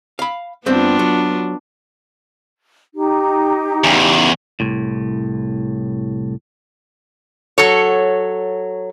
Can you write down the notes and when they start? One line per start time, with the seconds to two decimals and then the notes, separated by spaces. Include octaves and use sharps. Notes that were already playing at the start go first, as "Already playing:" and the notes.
0.19 F5 B5
0.66 G2 B3 C4 D4 F4
0.99 F#3
2.95 D#4 G4
3.84 E2 C#3
4.60 C2 A2
7.58 F#3 A4 C#5